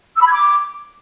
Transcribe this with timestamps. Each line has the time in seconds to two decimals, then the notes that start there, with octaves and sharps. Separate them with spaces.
0.16 E6
0.21 B5
0.27 G#6
0.32 D6